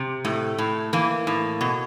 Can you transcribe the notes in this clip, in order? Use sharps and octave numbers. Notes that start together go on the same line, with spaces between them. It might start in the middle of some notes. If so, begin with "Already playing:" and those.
Already playing: C3
A2 A3
A2
E3 A#3
A2
B2